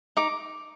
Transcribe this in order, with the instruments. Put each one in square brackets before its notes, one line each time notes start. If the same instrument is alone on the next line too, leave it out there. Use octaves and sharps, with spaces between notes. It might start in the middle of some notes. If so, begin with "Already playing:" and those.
[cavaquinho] D#4 D6